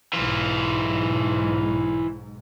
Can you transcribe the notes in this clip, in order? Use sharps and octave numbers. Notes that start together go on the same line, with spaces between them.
B1 G#2 E3 F4